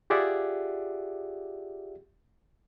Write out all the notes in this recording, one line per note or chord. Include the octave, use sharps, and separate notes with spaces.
F4 G4 G#4 D5 E5 F#5